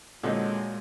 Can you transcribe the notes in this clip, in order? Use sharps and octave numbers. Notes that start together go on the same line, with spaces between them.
A#2 D3 G#3 C4 D#4 F#4 C#5 D#5